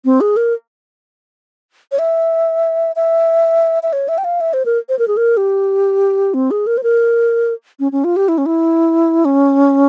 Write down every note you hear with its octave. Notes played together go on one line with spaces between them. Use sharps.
C4
G#4
A#4
C#5
E5
E5
E5
C#5
E5
G5
F5
E5
C5
A#4
C5
A#4
G#4
A#4
G4
C4
G#4
A#4
C5
A#4
C#4
C#4
F4
G4
E4
C#4
E4
C#4